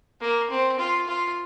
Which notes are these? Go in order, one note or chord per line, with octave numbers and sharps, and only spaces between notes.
A#3
C4
F4
F4